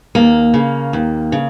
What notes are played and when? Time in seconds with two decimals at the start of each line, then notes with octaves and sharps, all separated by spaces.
0.15 D#2 A#3
0.54 C#3
0.93 D#2
1.32 C#3